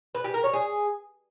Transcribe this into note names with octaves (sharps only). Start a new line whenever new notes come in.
B4
G4
A#4
C#5
G#4